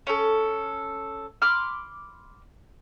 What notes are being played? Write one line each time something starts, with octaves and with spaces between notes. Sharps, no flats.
C#4 A4
B5 C6 D6 F6